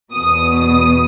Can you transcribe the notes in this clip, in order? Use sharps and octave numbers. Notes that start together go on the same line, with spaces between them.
E2 B2 D#6
D#6